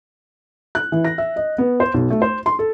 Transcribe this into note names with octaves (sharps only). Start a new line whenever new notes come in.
F#6
E3
A#6
E5
D#5
B3
C5
B1
A3
C5
C6
A4